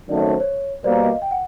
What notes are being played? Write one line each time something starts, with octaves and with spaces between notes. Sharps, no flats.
F#2 D#3 F#3 A3 C4 D5
C#5
C5
C#5
B2 G3 A#3 C5 D5
D#5 F5
G5
F#5